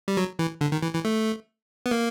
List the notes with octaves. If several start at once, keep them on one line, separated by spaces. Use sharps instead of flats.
G3
F#3
E3
D3
D#3
E3
E3
A3
B3
A#3